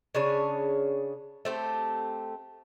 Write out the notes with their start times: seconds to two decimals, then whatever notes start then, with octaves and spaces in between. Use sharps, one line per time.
0.15 C#3 D4 G#4 C#5
1.45 A3 C4 G4